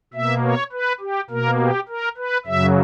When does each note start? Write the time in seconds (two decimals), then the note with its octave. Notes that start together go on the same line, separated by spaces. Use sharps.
0.14 B2 A#3 E5
0.43 C#5
0.72 B4
1.01 G4
1.30 B2 A#3 A#4
1.60 G4
1.88 A#4
2.17 B4
2.46 F#2 C#3 F#3 E5